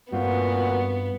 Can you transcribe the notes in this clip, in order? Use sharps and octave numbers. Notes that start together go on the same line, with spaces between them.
G2 A#2 B3 C4 F4 F#4